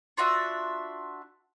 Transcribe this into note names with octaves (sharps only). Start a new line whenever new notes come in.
D4 F4 F#4 E5